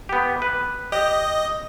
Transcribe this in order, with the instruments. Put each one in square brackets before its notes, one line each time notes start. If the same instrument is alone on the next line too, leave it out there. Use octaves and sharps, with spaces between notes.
[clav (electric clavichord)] B3 G4
B4
[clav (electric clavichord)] G4 [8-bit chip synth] D#5